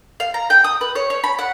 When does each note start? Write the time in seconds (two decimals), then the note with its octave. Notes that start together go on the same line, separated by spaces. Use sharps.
0.20 F5
0.34 A#5
0.50 G5
0.64 D#6
0.81 B4
0.95 C#5
1.10 C#5
1.24 B5
1.39 F#5